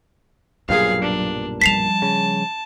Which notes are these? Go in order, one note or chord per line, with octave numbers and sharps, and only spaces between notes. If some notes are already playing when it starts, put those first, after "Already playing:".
B1 G2 A#2 F#3 G#4 F5
D4
F3 G3 A5 B6 C7 F7
C#3